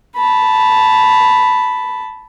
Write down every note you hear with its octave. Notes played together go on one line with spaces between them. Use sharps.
A5 B5